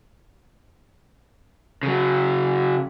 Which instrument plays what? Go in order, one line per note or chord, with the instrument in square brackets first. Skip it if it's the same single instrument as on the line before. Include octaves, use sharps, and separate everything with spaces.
[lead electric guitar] C#3 F#3